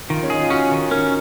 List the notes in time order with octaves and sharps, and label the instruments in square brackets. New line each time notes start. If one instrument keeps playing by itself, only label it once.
[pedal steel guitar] D#3 [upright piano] F4
[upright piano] C#4
[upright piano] D#4 [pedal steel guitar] G#4
[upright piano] F4
[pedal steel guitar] C#4 [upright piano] F#4
[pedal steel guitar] D#3
[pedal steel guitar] C#4 [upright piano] A#4